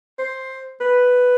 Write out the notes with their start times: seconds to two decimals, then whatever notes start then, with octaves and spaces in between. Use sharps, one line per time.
0.19 C5
0.81 B4